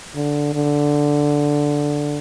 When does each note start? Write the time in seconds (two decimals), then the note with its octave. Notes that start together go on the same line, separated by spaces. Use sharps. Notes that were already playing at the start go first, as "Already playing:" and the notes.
0.16 D3
0.54 D3